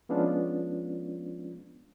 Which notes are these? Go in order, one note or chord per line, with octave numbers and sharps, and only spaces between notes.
F3 G#3 B3 C#4 D4 F4